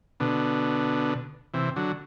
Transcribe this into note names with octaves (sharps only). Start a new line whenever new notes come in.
B2 D3
C3 E3
D3 F#3